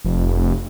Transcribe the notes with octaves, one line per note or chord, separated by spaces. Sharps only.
F1